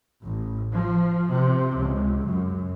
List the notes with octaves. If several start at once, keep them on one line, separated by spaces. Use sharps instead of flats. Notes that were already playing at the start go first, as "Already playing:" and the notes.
A1
F3
C3
C#2
F#2